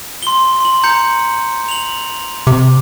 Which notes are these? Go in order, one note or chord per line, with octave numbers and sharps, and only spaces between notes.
C6 G7
C6 F#7
A#5 G6 C#7
F7 F#7
C3 D6